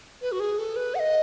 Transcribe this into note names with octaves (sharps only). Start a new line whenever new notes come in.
B4
F#4
G#4
A4
B4
F#5
D#5